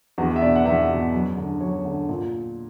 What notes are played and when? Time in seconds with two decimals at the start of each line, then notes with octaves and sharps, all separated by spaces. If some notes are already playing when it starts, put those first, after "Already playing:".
0.18 E2 F#4
0.36 E5
0.42 B2 D5
0.55 F#5
0.65 E2 E5
0.89 B2
1.13 F#2
1.37 D3
1.61 F#2 C#5
1.85 D3
2.09 A#2